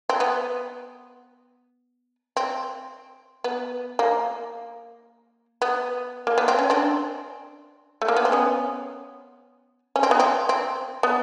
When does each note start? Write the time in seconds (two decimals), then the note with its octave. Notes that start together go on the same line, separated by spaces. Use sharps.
0.09 C4
0.20 B3
2.37 C4
3.44 B3
3.99 A#3
5.62 B3
6.27 A#3
6.38 B3
6.48 C4
6.59 C#4
6.70 C4 D4
8.02 A3
8.08 A#3
8.17 B3
8.25 C4
8.32 B3 C#4
9.96 C#4
10.03 C4
10.11 B3
10.19 C4
10.49 C4
11.03 B3